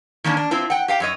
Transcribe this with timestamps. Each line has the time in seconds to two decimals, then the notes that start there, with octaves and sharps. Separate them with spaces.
0.24 D#3 A#3 C#4 D4
0.37 D4
0.51 C4 E4 F4 C5
0.70 F#5 G5
0.88 G4 F5 G5
1.00 F#2 C#5 D#5